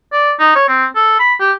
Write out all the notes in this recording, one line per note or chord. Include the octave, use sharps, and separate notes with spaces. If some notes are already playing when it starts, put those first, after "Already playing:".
D5
D#4
C#5
C4
A4
B5
G4